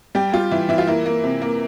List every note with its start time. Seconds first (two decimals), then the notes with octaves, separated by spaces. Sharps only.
0.15 G3 G4
0.33 G3 F4
0.51 E3 E4
0.69 E3 E4
0.78 F4
0.87 A#3 E4
1.06 A#3
1.24 C3
1.42 A#3